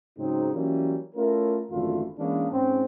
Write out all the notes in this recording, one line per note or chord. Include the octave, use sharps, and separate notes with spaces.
G#2 C#3 F#3 C4 D#4
E3 F#3 G3 A#3 C#4
A3 C#4 E4 F4 A#4
G#1 F#2 D3 E3 A3 F4
E3 G#3 A#3 B3 C#4 D4
G#2 C4 C#4